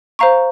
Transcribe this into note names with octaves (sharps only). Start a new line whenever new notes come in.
C5 F5 A#5 C#6